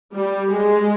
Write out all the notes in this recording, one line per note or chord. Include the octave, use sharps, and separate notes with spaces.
G3
G#3